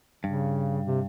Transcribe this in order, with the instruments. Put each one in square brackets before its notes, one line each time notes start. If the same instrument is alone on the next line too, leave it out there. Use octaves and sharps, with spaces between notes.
[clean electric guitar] G2 [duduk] C#3
[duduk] C3